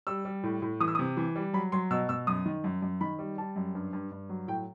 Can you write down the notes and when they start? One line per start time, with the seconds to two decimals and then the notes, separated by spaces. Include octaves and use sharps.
0.07 G3 E6
0.25 G3
0.43 A2
0.62 A2
0.80 E3 D#6
0.88 E6
0.95 C3 D#6
1.17 E3
1.36 G3
1.53 F#3 B5
1.72 F#3 C6
1.91 B2 E6
2.09 B2 E6
2.27 F#2 D#6
2.46 D#3
2.64 F#2
2.82 F#2
3.01 D#3 B5
3.19 G3
3.38 G3 A5
3.56 F#2
3.75 G2
3.93 G2
4.11 G2
4.29 F#3
4.48 A2 G5